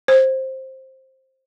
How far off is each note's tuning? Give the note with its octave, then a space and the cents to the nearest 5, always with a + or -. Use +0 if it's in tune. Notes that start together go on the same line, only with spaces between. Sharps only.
C5 +15